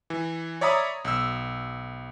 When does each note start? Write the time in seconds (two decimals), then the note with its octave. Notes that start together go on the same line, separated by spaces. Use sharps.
0.10 E3
0.61 C#5 D5 E5 A#5 B5 D#6
1.05 B1 E6